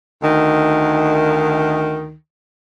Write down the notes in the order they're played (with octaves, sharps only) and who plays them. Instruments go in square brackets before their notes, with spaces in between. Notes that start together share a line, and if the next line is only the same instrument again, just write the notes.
[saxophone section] D2 D#3